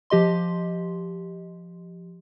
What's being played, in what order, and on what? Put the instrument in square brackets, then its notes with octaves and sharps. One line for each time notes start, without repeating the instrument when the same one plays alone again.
[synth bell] F3 G4 D#5 C6